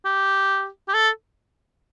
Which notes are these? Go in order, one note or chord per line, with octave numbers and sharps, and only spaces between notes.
G4
G4
A4